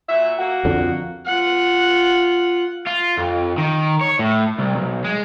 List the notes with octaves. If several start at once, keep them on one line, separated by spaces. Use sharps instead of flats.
A#2 F#4 E5
A#3 F#4
F2 D3
F4 F#5
F4
F2
D#3
C#5
A2
C2
B1
G#3